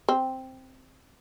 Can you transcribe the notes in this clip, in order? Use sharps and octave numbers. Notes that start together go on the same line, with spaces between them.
C4